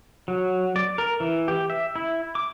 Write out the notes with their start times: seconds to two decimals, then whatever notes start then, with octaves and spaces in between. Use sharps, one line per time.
0.28 F#3
0.76 D5
0.98 A#4
1.20 E3
1.48 G4
1.70 E5
1.96 E4
2.35 D6